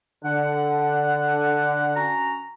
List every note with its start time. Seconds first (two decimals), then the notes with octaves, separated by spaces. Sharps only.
0.25 D3 F#5
1.96 C#4 F#4 A#5